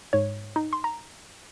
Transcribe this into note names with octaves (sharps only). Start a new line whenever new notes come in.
G#2 C#5
D#4
C6
A#5